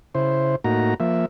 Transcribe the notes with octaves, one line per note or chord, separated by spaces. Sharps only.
C#3 E4 C5
A2 A#3 D#4 F#4 A#5
F3 A#3 E5